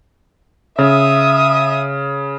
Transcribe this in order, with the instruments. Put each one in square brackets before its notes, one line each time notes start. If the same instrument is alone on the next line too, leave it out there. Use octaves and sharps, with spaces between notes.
[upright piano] C#3 [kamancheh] E5 D#6